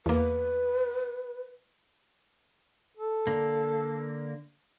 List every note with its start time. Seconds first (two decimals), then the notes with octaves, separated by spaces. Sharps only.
0.06 E2 A#3 B4
2.97 A4
3.27 D3 A#3